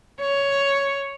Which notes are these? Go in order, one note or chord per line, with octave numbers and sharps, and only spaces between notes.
C#5